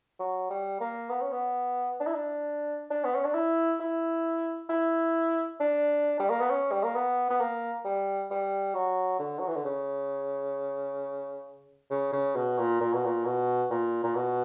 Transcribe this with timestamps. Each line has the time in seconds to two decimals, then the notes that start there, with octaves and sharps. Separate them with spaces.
0.19 F#3
0.50 G3
0.80 A#3
1.10 B3
1.22 C#4
1.32 B3
2.00 D4
2.07 E4
2.14 D4
2.90 D4
3.04 B3
3.15 C#4
3.25 D4
3.34 E4
3.80 E4
4.69 E4
5.60 D4
6.20 G3
6.29 A#3
6.40 B3
6.50 C#4
6.72 G3
6.83 A#3
6.95 B3
7.30 B3
7.41 A#3
7.85 G3
8.31 G3
8.75 F#3
9.19 D3
9.39 F#3
9.48 E3
9.56 D3
9.65 C#3
11.90 C#3
12.13 C#3
12.36 B2
12.58 A#2
12.81 A#2
12.93 B2
13.05 A#2
13.25 B2
13.70 A#2
14.04 A#2
14.15 B2